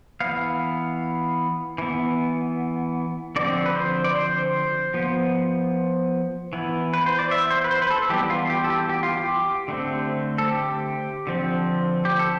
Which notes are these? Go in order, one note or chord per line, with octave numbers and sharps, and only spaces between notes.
E3 B3 F5
E3 B3
D3 F3 C4 D5
B4
C5
D5
C5
F3 B3
E3 B3
B4
C5
D5
E5
C5
B4
C5
B4
A4
E3 G3 B3 G4
G4
F4
G4
A4
G4
G4
F4
G4
D3 A3 C4
A4
G4
D3 F3 C4
G4
A4